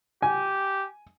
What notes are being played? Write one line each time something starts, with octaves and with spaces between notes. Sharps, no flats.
G4 G#5